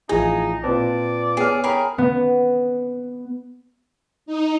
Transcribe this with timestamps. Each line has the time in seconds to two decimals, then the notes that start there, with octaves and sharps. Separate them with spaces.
0.09 A1 F3 D#4 E4 G#4 D#5 G#5
0.64 A#2 C4 B4 D5 A5
1.37 B3 G#4 C#5 F6
1.64 G#4 A#4 C#5 G5 B5 D#6
1.98 B3
4.26 D#4